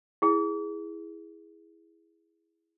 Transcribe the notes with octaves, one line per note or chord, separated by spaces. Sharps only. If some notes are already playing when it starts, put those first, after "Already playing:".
E4 G#4